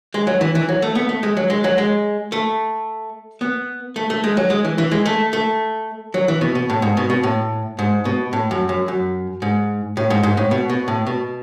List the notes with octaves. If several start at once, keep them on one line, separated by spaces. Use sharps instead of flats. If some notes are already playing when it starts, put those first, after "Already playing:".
G#3
F#3
E3
E3
F#3
A3
B3
A3
G#3
F#3
G#3
F#3
G#3
A3
B3
A3
A3
G#3
F#3
G#3
E3
E3
G#3
A3
A3
F#3
E3
B2
B2
A2
G#2
B2
B2
A2
G#2
B2
A2
F#2
F#2
F#2
G#2
A2
G#2
G#2
A2
B2
B2
A2
B2